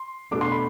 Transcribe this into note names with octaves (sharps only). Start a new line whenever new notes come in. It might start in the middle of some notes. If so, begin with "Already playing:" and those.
Already playing: C6
B2 A3 D4 D6
C6
B5